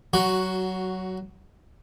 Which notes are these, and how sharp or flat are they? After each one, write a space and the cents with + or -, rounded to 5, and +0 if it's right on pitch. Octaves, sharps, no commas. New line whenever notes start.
F#3 +20 F#4 +0